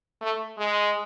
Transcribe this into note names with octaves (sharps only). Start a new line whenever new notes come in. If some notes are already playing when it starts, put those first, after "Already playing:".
A3
G#3